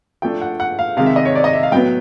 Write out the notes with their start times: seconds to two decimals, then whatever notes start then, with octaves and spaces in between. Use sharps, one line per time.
0.22 F3 A3 D4 G5
0.41 F#5
0.60 F#5
0.79 F5
0.97 C3 D#3 G#3 F5
1.06 E5
1.16 D#5
1.25 C#5
1.35 D5
1.44 D#5
1.53 E5
1.63 F5
1.72 A2 F#3 B3 G5